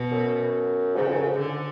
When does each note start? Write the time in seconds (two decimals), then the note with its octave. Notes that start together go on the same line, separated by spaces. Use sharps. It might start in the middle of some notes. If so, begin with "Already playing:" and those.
Already playing: B2
0.12 F#2
0.96 G#2 C#3
1.07 F2
1.17 F#2
1.27 G#2
1.38 D3